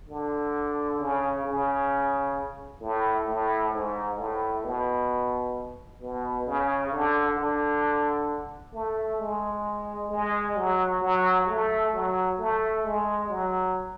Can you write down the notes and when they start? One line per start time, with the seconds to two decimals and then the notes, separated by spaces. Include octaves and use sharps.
0.09 D3
1.00 C#3
1.45 C#3
2.81 A2
3.27 A2
3.73 G#2
4.18 A2
4.64 B2
6.01 B2
6.47 C#3
6.92 D3
7.37 D3
8.74 A3
9.19 G#3
10.11 G#3
10.56 F#3
11.02 F#3
11.47 A3
11.93 F#3
12.39 A3
12.84 G#3
13.29 F#3